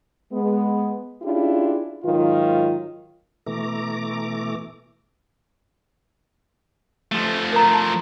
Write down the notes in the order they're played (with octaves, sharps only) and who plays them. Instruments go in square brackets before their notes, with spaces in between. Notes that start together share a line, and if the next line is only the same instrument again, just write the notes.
[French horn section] G#3 B3
C#4 D4 E4 F4 G4 G#4
G#2 D#3 F#3 F4
[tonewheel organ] B2 E3 A3 A#5 D6
[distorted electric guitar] F3 A3
[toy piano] A#4 A#5
A5